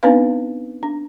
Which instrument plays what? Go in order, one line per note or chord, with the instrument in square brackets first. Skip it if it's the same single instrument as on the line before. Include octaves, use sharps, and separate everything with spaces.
[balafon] B3 C4 D4 D#4 B4 F5
D4